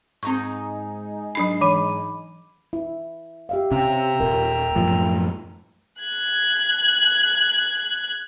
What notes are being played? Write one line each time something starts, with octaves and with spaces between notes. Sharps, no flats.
G#2 C4 D#4 G#4 C#6
F#3 D4 B5 C7
E3 B5 D6 D#7
E4
G4 E5 F5
C3 C#4 E5 G5 A#5
D#1 A#4
F#2 A2 F3
F#6 G#6